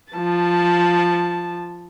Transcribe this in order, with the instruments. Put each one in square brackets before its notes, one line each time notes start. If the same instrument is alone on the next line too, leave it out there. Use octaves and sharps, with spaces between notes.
[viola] F3 A5